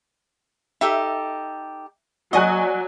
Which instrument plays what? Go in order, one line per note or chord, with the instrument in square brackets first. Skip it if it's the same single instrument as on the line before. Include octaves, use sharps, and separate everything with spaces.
[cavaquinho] D#4 G4 A4 [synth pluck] E5
[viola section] F#3 [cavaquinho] F#4 [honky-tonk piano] D5 G#5 F#6 [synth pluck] D#5